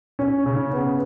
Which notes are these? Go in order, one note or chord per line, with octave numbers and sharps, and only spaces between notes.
C#4
C#3
B3